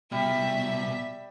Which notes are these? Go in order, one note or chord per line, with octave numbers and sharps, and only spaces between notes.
C2 B2 G3 E5 B6